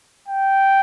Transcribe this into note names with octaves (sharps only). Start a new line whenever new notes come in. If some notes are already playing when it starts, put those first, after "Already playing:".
G5